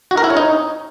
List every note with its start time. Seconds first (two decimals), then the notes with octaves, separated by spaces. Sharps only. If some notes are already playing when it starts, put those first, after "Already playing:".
0.11 F#4
0.17 A#4
0.24 E4
0.30 C#5
0.37 D#4